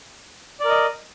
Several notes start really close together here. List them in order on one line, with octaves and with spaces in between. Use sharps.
D5 A#4 D#5